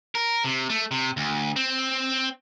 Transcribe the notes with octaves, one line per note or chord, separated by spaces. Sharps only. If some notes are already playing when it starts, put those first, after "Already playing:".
A#4
C3
A3
C3
D2
C4